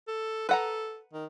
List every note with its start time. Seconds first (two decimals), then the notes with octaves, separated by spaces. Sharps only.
0.08 A4
0.49 A4 B4 F#5 A#5
1.13 D#3